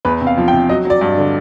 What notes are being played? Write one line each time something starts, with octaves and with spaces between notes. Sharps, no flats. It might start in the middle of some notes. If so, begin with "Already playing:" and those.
E2 B4
C3
F5
F3
G5
C3
F#3 D#5
F#3 D5
G2
D3